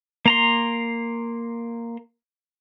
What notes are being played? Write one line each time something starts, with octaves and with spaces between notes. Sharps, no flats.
A#3 A#5 C6